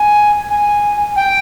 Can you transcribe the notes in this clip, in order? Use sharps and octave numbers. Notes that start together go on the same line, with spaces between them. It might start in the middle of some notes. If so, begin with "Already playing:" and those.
Already playing: G#5
G#5
G5